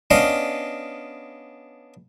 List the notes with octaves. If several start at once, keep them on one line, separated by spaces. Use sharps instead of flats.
B3 C#4 D4 D#5 F5